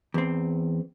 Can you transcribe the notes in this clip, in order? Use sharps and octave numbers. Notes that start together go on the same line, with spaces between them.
E2 C4